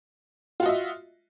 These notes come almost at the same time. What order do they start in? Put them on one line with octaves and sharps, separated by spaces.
F4 F#4 D#5 E5